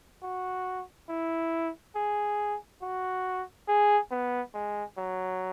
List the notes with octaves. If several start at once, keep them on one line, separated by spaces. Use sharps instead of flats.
F#4
E4
G#4
F#4
G#4
B3
G#3
F#3